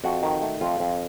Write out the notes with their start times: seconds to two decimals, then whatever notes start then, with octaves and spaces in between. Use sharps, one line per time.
0.04 F2 F#4
0.23 D#3
0.42 A3
0.61 F2 F4
0.80 F2